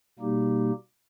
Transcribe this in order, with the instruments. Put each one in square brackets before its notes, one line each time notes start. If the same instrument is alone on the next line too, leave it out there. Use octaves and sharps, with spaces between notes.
[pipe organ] B2 G3 A#3 D#4 G4